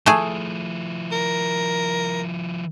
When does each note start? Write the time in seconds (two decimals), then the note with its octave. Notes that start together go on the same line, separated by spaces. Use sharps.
0.06 F3 A3 E4 G#4
1.12 A#4